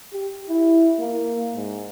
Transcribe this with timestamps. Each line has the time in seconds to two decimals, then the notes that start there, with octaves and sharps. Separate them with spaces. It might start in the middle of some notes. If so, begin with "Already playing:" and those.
0.13 G4
0.49 E4
0.99 A#3
1.56 G#2